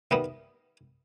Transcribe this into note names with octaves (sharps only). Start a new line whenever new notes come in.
D#2 D#3 G3 B3 E5